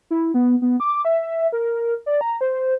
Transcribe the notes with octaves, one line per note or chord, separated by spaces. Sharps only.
E4
B3
B3
D6
E5
A#4
D5
A#5
C5